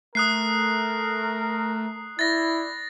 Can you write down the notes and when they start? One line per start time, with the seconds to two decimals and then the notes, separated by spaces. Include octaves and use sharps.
0.15 A3 A#4 D#6 F#6 C7
2.19 E4 D5 A6 A#6